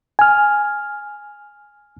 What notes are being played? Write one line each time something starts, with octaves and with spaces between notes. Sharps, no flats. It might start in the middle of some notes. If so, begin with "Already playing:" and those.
G#5 F6